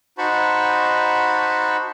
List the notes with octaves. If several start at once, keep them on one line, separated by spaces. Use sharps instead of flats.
D#4 F#4 C5 A5 B5 C#6